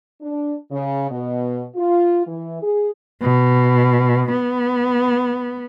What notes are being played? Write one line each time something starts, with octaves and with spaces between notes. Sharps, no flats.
D4
C#3
B2
F4
E3
G#4
B2
B3